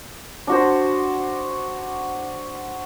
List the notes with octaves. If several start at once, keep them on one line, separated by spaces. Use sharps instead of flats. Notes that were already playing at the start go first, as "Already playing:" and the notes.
D4 F#4 C5